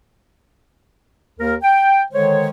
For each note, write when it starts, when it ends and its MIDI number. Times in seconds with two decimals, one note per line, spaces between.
1.40 1.54 39
1.40 1.54 70
1.62 2.02 79
2.13 2.48 50
2.13 2.48 51
2.13 2.48 56
2.13 2.48 72
2.13 2.48 73